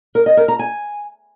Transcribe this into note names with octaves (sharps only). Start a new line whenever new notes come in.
A#4
D#5
A#4
A#5
G#5